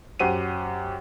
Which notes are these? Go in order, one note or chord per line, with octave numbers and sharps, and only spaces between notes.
F#2 G4 C5 F#5 D#7